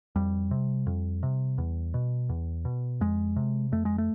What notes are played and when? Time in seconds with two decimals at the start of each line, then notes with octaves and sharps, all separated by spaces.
0.16 F2 G3
0.51 C3
0.87 F2
1.23 C3
1.58 E2
1.94 B2
2.29 E2
2.65 B2
3.01 F2 G#3
3.36 C3
3.72 F2 A3
3.85 G#3
3.98 A3